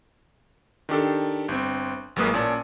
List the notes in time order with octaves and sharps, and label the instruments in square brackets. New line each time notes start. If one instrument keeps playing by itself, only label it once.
[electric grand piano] D#3 D4 G4 A4
G1 C4
A1 F#3 G#3 A#3 B4 D#6
A#2 C#4 D5 A5